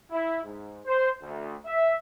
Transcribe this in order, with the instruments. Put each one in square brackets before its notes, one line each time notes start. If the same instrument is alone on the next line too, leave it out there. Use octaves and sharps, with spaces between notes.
[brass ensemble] E4
G#2
C5
D2
E5